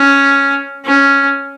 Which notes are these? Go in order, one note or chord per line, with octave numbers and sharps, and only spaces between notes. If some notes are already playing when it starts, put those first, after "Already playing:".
Already playing: C#4
C#4